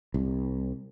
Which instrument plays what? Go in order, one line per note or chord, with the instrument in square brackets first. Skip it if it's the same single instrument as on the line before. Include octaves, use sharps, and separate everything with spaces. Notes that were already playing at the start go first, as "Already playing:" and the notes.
[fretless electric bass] C2